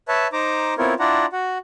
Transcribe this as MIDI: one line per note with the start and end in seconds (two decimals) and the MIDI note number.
0.08 0.28 71
0.08 0.28 73
0.08 0.28 76
0.08 0.28 81
0.33 0.74 63
0.33 0.74 72
0.33 0.74 82
0.33 0.74 86
0.78 0.94 59
0.78 0.94 60
0.78 0.94 64
0.78 0.94 65
0.78 0.94 70
0.78 0.94 73
0.99 1.26 62
0.99 1.26 64
0.99 1.26 65
0.99 1.26 74
0.99 1.26 78
0.99 1.26 82
1.32 1.58 66
1.32 1.58 78